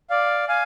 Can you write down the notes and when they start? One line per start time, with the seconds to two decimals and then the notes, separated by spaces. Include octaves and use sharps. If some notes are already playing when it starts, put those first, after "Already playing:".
0.10 D5 F5
0.48 F5 G#5